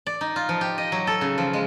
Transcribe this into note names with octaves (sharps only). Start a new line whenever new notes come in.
D5
D#4
F4
F3
G4
D#5
F#3
A4
C#3
F3
G#3